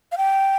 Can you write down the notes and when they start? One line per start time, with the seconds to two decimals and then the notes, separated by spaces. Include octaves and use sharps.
0.12 F5
0.17 G5